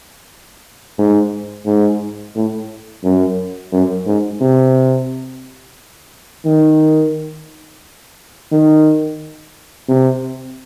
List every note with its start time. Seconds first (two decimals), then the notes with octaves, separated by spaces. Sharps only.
0.99 G#2
1.66 G#2
2.36 A2
3.04 F#2
3.72 F#2
4.06 G#2
4.41 C3
6.45 D#3
8.51 D#3
9.89 C3